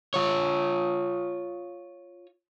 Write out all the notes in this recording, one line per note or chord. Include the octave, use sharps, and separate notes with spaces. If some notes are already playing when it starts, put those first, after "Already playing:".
F4 C#5